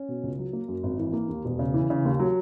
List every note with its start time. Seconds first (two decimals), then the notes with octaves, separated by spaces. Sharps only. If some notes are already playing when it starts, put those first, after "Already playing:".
Already playing: C#4
0.08 B2
0.23 C#2
0.39 F#3
0.53 A#3
0.68 F#2
0.83 G#1
0.99 E3
1.13 A#3
1.29 D#2
1.45 E1
1.59 C#3
1.74 E3
1.90 C#3
2.05 D#2
2.19 F#3